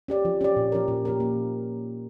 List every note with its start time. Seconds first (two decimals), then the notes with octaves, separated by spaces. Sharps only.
0.08 C#4 G4 D5
0.25 F3
0.41 C#4 G4 D5
0.56 A#2
0.72 F3 C#4 G4 A#4
0.88 A#2
1.05 F3 C#4 G4 A#4
1.20 A#3